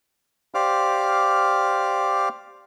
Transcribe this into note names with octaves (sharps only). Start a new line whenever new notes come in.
G4 C5 D5 F5 D6 F6